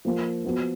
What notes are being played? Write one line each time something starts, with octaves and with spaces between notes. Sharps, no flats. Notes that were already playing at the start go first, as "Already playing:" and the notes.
F3 A#3 F4
F3 B3 F#4